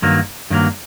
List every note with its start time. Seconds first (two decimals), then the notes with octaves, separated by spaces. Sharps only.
0.02 G2 D#3 F#3 A#3
0.50 G2 D#3 F#3 A#3